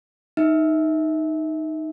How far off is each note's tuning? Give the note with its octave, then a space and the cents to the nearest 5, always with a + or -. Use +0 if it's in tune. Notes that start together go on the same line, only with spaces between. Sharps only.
D#4 +0 E5 -20